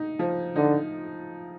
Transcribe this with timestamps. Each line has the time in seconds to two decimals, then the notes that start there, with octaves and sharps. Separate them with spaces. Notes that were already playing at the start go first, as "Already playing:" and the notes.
Already playing: D#4
0.19 F3
0.56 D3 D#4